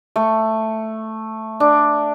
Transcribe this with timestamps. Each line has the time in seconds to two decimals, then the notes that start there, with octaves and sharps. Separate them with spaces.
0.16 A3
1.60 D4